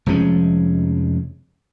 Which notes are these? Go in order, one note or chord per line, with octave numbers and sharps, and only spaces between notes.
F1 F3 G#3 C#4